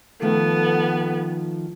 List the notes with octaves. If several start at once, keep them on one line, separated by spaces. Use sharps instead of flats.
D#3 F3 A3 B3 A4